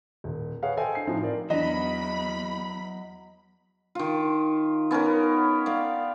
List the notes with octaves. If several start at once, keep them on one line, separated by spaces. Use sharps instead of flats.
D#1
G#4 B4 C#5 F5 F#5
A4 C5 D#5 G5 G#5
D4 C7
A2 F3 C4 D4 D#4 F#4
F4 A#4 D5
E2 E3 F#3 D4 D#5 B5
D#3 F4
B3 C#4 D#4 A#4
D5 F5 G5